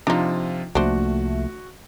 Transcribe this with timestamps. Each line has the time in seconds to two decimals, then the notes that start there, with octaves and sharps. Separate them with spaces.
0.07 C3 F3 D4 D#4 F4
0.75 C2 F3 A3 A#3 D4 F#4 C5